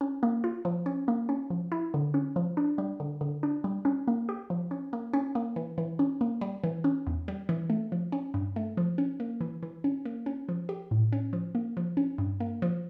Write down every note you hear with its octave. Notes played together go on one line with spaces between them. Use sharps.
C#4
A#3
F4
F3
C#4
A#3
C#4
F3
E4
D3
C#4
F3
D4
G3
D3
D3
D4
G3
C#4
A#3
G4
F3
C#4
A#3
C#4
A#3
E3
E3
C#4
A#3
G3
E3
C#4
E2
G3
E3
A3
F3
C#4
G2
A3
F3
C#4
A#3
E3
E3
C#4
A#3
C#4
F3
G4
A2
C#4
F3
A#3
F3
C#4
G2
A#3
F3